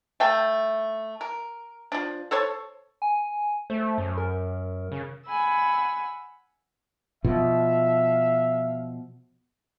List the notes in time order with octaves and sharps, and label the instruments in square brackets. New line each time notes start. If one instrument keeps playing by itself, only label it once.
[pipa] A3 F5 G5 A5
A#4
F3 D4
A4 C5 C#5 A5
[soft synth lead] G#5
[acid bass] A3 [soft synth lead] C5
[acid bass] F#2
[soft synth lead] A#4
[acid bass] C#3
[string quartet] F#5 G#5 B5 E6
[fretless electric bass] B2 F3 [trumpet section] E5 F5